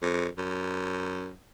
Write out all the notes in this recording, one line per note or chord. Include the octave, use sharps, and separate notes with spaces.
F2
F#2